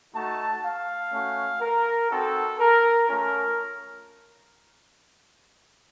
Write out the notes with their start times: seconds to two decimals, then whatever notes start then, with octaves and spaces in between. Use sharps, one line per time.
0.14 A3 D#4 F#4 A5
0.63 F5
1.12 A3 C#4 F#4
1.62 A#4
2.10 C4 D#4 F#4 A4
2.59 A#4
3.08 A3 C#4 F4 A#4